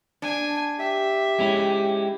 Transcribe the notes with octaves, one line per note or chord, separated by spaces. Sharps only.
D4 G#5
G4 E5
G#3 C#4 E4